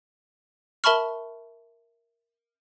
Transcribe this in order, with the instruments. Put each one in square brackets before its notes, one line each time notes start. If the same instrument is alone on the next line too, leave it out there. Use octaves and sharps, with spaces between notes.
[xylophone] A#4 E5 A5 B5 C#6 F6